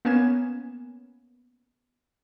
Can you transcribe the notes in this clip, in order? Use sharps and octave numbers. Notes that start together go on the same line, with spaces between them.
A#3 B3 C#4 G#5 E7